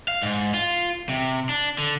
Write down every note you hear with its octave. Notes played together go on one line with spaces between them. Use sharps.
F5
G#2
F4
C3
D4
D3